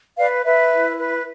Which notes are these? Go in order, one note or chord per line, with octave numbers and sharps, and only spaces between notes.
B4 D5 F5
B4 E5
E4
B4